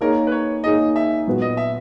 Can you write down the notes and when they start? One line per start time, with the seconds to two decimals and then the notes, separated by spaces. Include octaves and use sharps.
0.01 A#3 D#4 G#4 A#4 C#5
0.27 B4
0.32 C#5
0.64 A#3 D#4 G#4 C#5 D#5
0.96 E5
1.27 A#2 F#3 B3 F#4
1.42 D#5
1.57 E5